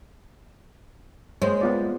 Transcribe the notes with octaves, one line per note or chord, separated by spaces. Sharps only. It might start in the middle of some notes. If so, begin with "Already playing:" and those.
G#3 A#3 C5 C#5
B3 F4 D5